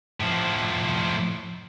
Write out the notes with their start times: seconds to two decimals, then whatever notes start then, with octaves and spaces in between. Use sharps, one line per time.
0.20 A2 F3